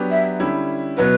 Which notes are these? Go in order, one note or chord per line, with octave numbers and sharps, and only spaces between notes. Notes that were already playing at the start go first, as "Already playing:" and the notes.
Already playing: F#3 B3 D4 G4 B4
E5
D3 G3 C#4 E4
B2 F#3 B3 B4